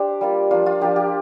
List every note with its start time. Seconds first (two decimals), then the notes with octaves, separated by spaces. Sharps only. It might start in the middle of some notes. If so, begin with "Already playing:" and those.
Already playing: D4 G4 C5
0.21 G3 A#3 F4
0.51 F3 A#3 D4 F4
0.66 F4
0.81 F3 A#3 D4 G4
0.96 G4